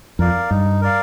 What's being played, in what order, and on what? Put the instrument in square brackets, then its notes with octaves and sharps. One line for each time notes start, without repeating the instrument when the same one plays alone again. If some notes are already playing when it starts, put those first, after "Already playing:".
[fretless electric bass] F2 [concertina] A#4 D5 F5
[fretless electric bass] G2 [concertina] D#4
[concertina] A#4 D5 F5